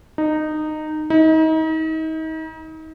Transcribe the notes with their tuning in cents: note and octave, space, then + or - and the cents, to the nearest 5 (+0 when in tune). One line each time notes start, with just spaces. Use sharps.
D#4 -15
D#4 +35